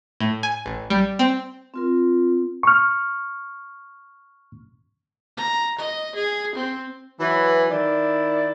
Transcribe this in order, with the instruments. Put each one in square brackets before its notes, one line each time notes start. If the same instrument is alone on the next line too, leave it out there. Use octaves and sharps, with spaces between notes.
[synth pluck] A2
G#5
A1
G3
C4
[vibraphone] C4 F4 A#4
[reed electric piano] C#6 F6
[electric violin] A#5
D#5
G#4
C4
[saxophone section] E3 F#3
D#3 E4 D5